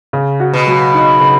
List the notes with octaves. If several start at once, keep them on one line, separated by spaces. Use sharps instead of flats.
C#3
F#4
B2
F#3
D#4
C#3